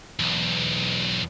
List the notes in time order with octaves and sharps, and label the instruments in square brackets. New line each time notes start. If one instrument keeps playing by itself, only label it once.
[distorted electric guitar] B1 E2